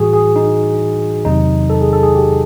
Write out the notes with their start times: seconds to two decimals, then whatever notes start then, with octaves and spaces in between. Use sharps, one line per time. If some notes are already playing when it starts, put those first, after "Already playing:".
Already playing: A2 E3 G3 F#4 G#4
0.13 G#4
0.36 D#4
1.25 E2 C3 D#3 F#3 D#4
1.70 A4
1.81 G#4
1.93 A4
2.03 G#4
2.15 G4